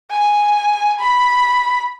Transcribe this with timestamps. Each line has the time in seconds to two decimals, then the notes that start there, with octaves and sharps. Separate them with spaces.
0.11 G#5
1.00 B5